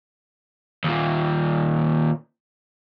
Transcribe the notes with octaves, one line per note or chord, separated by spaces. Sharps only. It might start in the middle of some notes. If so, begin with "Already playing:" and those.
D#2 A#2